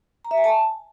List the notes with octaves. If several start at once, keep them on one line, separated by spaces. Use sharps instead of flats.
A#5
E5
G#5
A5